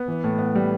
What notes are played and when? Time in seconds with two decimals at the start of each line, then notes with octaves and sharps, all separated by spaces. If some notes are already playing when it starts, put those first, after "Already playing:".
Already playing: B3
0.08 E3
0.24 A2
0.39 B3
0.55 G3